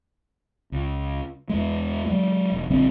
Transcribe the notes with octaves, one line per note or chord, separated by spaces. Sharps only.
C#2
E2 G#3
F#3 G#3
E1
A#1 D3 G3 C4